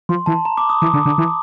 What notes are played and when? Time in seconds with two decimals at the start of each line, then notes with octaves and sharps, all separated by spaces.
0.09 F3 C6
0.26 E3 A5
0.45 A#5
0.57 D6
0.69 D#6
0.82 E3 D6
0.94 D3
1.06 D3
1.18 E3